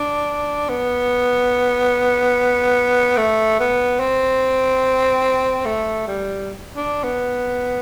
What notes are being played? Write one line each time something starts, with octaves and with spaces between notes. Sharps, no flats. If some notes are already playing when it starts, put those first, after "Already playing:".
Already playing: D4
B3
A3
B3
C4
A3
G3
D4
B3